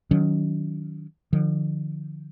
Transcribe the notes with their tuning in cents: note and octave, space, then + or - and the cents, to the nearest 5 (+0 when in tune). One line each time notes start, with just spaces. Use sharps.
D#3 +0 F#3 +0 C#4 +30
D3 +40 F3 +0